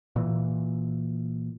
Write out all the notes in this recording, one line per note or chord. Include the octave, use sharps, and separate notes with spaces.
A#2 E3